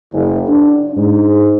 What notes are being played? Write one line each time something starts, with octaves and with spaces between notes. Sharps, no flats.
F#1
D4
G#2